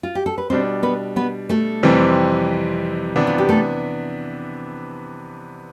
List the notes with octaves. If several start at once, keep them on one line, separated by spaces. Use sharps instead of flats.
F4
G4
A4
B4
B2 G3 C4 D4 C5
B3 B4
B3 B4
A3 A4
F2 C3 E3 G3 C4
C3 E3 B3 D4
F4
G4
A3 A4